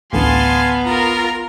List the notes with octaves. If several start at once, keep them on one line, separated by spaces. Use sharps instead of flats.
A1 D2 B3 F5 G#5 A5 C6
F4 A#4 A#5